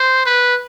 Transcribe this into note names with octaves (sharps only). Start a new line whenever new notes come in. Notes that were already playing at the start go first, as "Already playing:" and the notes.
Already playing: C5
B4